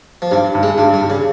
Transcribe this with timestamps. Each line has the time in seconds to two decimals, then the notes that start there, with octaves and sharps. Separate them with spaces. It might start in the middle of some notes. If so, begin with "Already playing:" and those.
0.22 F3
0.31 G2 G3
0.55 G2
0.63 G#3
0.78 G2 G3
0.94 G3
1.02 G2
1.10 C#3